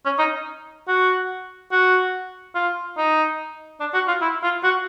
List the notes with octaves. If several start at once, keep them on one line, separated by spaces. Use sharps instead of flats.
C#4
D#4
F#4
F#4
F4
D#4
D4
F#4
F4
E4
F4
F#4